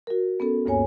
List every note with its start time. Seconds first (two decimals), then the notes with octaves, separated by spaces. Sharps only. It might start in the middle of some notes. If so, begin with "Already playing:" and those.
0.07 F#4 A#4
0.40 B3 C#4 A4
0.66 D2 G2 A#3 C#5 G#5